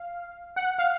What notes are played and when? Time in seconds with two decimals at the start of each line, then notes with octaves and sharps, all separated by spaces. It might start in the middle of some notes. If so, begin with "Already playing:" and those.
Already playing: F5
0.56 F#5
0.78 F5